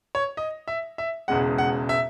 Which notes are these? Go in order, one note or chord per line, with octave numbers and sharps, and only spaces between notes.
C#5
D#5
E5
E5
E1 E2 C#3 G#3 F#5
F#5
E5